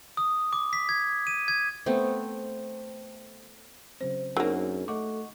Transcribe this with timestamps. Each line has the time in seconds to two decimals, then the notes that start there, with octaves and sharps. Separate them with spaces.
0.17 D#6
0.53 D6
0.73 B6
0.89 G#6
1.27 D#7
1.48 G#6
1.86 A3 B3 C4
4.01 C#3 F#3 C4 C5
4.37 F#2 F#3 A#3 C4 D4 D#4 G#4
4.88 A3 D#5 F#5 C#6 D6